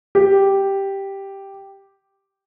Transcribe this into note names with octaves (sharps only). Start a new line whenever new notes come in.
G4